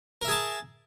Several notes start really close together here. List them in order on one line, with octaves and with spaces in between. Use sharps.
A#4 E5 G#4 A5